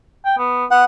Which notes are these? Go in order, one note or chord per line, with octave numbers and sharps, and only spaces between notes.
G5
B3
B3 F#5